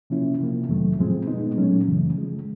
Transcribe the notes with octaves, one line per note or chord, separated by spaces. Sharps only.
C3 F3 A#3 C#4 E4
C3 F3 A#3
F2 C3 D#3 F#3 A3
A2 F3 G#3 C4
B2 G#3 B3 D#4
A#2 F#3 A3 C#4
F#2 C#3 E3 A3
C#3 F3 G#3